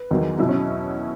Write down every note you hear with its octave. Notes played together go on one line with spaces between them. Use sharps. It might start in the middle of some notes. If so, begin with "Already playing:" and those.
Already playing: B4
E2 D#3 F#3
B2 F#3 E4
C#4